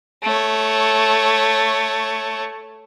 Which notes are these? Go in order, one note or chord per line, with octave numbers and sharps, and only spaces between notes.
A3 C#5